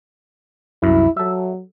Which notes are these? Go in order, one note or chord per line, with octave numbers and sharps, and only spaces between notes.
C2 F#2 E4
F#3 A4 E5